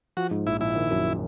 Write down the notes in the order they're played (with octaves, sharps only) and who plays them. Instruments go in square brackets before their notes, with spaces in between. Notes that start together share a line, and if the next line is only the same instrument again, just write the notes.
[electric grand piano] F3 [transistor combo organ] F#4
[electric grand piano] G#2
[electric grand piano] A#1 [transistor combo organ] E4
[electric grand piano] A#1 [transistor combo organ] E4
[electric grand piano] D#3
F#2